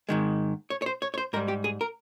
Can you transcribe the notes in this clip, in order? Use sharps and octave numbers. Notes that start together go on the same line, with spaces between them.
G#2 D#3 G#3
C#5
C#5
C5
C#5
C#5
C5
G#2 G3 A#4
G4
G#4
A#4